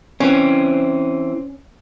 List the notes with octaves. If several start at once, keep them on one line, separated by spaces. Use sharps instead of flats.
E3 C4 C#4